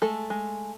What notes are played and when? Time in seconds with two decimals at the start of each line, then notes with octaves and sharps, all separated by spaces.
0.02 G#3 A3 A4
0.30 G#3